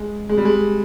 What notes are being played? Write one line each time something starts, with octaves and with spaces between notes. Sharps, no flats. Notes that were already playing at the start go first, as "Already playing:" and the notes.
Already playing: G#3
G#3
G3
G#3